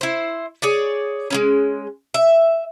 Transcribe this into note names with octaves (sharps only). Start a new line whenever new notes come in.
E4 C5
G#4 C#5 D5
G#3 B3 C#4
E5